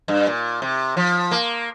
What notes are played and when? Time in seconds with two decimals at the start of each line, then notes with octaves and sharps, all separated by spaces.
0.08 G2
0.27 A#2
0.62 C3
0.97 F3
1.31 A#3